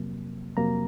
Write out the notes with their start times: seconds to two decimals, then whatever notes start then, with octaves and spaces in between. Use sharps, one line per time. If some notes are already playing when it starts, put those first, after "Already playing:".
Already playing: F2 C3 F#3 A#3
0.57 F2 C3 F#3 A#3 A#5